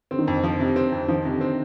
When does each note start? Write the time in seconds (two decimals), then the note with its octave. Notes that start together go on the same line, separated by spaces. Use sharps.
0.11 D3 C4
0.19 D#3
0.26 F2 D3
0.43 F3
0.60 C3
0.76 C4
0.92 F2
1.08 D#3 F3
1.25 C3
1.32 D3
1.41 C4